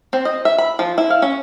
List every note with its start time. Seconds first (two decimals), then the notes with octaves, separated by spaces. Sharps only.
0.13 C4
0.25 D#5
0.45 E5
0.58 B5
0.79 F3
0.98 E4
1.10 F5
1.22 C#4